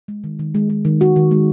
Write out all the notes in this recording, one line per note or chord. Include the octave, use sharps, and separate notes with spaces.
G#3
D#3
D#3
G#3
G#3
D#3
G#3 F#4
D#3
G#3